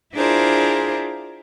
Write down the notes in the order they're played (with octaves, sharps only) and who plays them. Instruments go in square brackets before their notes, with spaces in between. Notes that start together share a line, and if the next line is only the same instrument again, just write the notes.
[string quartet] D4 E4 F4 G#4 A#4 C5